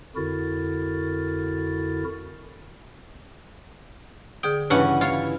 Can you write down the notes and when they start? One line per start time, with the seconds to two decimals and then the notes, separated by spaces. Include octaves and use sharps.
0.16 F2 D3 E4 F#4 A#4 A6
4.43 D3 G#4 G5 D#6
4.70 G2 C#3 E3 C#4 F#5
5.01 E4 F4 C#5 C#6